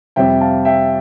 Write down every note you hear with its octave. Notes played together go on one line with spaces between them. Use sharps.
F2 C3 G3 C4 E5 G5
F5 A5
E5 G5